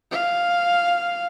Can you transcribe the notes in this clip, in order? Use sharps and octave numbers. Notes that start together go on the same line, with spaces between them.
F5